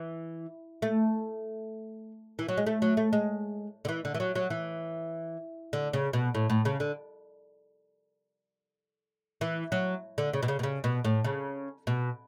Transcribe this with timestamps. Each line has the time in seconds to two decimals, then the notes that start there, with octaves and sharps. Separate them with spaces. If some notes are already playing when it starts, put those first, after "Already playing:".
Already playing: E3
0.82 A3
2.39 E3
2.49 F#3
2.57 G#3
2.67 A3
2.82 F#3
2.97 A3
3.13 G#3
3.85 D3
3.89 E3
4.05 D3
4.15 E3
4.20 F#3
4.35 F#3
4.50 E3
5.73 D3
5.93 C#3
6.13 B2
6.35 A2
6.50 A2
6.65 C#3
6.80 D3
9.41 E3
9.72 F#3
10.18 D3
10.33 C#3
10.43 B2
10.48 C#3
10.59 B2
10.63 C#3
10.84 B2
11.04 A2
11.24 C#3
11.87 B2